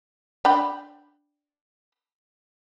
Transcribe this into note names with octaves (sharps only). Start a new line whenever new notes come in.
D4 G5 B5